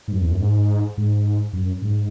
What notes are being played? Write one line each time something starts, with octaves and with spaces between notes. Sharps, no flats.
G#2
F#2
E2
F#2
G#2
G#2
F#2
G#2